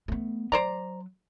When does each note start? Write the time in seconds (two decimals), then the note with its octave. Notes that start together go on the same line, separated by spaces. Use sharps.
0.08 A3 B3
0.52 F#3 C5 D5 A#5